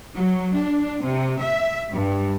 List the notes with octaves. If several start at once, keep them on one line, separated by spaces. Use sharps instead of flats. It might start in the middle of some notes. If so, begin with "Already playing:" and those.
F#3
D4
C3
E5
G2